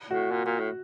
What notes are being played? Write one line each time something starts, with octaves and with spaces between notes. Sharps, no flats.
A2 F#4
A#2
A#2
A2